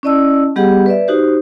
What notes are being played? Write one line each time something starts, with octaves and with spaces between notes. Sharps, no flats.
C#4 E4 D5 D#5 A5 E6
G3 B3 G4 G#4 D#5 F#5
B4 D5 E5
D#4 F#4 G4 C5